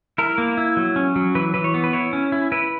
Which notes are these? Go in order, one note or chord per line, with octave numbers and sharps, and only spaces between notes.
E4 A#4
A#3
E4
F#3
C#4
F#3
E3 B4
E3 B4
C#5
B3
B4
E4 C#5
C#4
E4
E4 B4